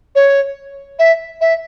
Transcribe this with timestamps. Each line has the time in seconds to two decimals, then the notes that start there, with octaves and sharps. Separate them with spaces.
0.15 C#5
0.99 E5
1.41 E5